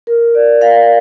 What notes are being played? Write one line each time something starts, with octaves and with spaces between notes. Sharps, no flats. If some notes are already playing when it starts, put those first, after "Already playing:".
A#4
D5
F5